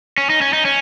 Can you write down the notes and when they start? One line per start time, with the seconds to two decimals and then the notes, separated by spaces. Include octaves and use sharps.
0.18 C#4
0.30 D#4
0.41 C#4
0.53 D#4
0.65 C#4